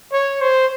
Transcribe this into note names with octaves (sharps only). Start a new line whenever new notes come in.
C#5
C5